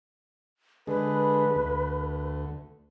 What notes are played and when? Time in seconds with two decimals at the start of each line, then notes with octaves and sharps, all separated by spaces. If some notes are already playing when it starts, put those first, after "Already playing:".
0.87 D3 G#3 B4
1.56 D2